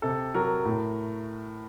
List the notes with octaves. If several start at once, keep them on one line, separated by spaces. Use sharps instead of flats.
C3 A4
F#3 A#4
A2